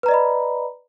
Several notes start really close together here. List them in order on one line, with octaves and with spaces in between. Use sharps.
B4 A#5 D5 D#5 B5